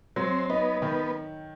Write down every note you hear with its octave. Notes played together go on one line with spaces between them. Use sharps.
F#3 C4
B3 D#4
D#3 B3